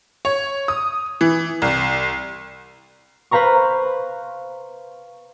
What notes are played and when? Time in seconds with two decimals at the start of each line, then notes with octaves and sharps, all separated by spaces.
0.25 C#5
0.68 D#6
1.21 E3
1.62 C2
3.31 B4 C5 F5 A#5 C#6